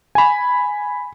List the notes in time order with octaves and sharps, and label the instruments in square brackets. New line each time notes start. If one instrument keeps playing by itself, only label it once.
[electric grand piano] G#5 B5